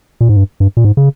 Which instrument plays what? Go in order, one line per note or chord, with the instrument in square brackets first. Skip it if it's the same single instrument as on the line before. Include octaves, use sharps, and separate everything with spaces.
[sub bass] A#2
G#2
G2
G2
A#2
G#2
C#3